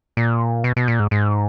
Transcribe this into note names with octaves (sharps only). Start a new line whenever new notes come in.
A#2
B2
B2
A#2
G#2
G#2